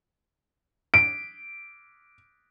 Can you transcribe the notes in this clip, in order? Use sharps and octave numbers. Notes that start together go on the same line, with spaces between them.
D7